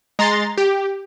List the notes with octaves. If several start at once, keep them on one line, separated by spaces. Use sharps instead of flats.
G#3 A#5 C6 A6
G4